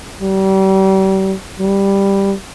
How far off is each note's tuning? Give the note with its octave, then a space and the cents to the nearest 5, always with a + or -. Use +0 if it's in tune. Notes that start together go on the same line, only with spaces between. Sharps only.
G3 -35
G3 +5